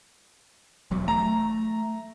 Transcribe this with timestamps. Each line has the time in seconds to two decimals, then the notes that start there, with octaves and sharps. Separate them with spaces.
0.91 E1 E2 F#3
1.08 A3 A#5